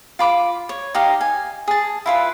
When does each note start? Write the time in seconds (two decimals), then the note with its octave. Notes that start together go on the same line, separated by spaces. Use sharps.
0.19 F4 B5 D6
0.69 C#5
0.94 D#4 G4 F5
1.21 G#5
1.68 G#4 A5
2.06 E4 F4 B4